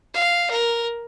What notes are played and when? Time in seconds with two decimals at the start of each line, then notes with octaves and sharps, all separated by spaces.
0.14 F5
0.51 A#4